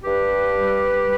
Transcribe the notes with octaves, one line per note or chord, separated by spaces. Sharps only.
G2 G4 B4
G3
G3